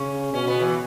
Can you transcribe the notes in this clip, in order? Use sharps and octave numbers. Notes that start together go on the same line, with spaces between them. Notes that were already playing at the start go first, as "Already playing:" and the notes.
Already playing: C#3 C#4
B2 C#4
B3
E3